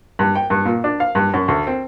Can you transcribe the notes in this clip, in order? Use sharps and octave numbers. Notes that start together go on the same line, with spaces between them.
G2
G5
G2
A#2
D4
F5
G2
F#2
D2
C4